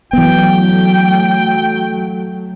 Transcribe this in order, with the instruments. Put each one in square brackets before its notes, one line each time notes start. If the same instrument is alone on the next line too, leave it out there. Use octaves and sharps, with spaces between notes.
[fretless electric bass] E3 B3 [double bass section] F#3 A3 [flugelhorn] G5